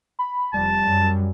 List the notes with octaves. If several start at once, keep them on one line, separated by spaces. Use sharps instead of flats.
B5
F1 G3 A5
F#2